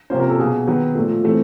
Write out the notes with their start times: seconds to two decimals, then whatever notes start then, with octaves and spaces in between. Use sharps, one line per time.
0.10 C3 F3 A#3 C#4 C5
0.20 A#4
0.30 A4
0.38 B2 F#3 A#3 G#4
0.67 D#3 F#3 B3
0.95 A#2 F3 A3
1.24 E3 A3 C4